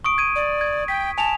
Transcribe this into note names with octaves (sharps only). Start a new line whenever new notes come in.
C#6 D#6 D7
G#6 D#7
D5
G#6
G5 B6
G#5 A5 F7